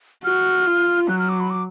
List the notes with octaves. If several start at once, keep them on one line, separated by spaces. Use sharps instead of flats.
F#4 F6
F4
F#3 F#6
F6
D6
B5
D6